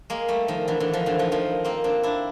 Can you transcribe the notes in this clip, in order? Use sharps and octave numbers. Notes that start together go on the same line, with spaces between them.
G#3 A#3
G3 A3
D#3 F3
D3 E3
D3 E3
D#3 F3
D3 E3
D#3 F3
D#3 F3
A#3 C4
C4 D4
D4 E4